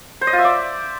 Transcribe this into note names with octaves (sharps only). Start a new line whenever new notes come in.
C5
D#5
F4
E5
D5